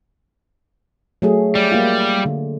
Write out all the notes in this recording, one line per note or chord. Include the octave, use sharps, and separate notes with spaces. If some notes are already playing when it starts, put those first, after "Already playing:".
F#3 A3 G#4
G3 D5
A#3 F4
D3